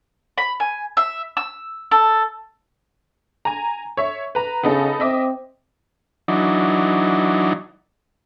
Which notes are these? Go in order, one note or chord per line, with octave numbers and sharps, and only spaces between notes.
B5
G#5
E5
E6
A4
G#5 A#5
C#5 E5
B4 A#5
C#3 B3 D#4 A4
C4 D#5 E5 D6
E3 F#3 D4 D#4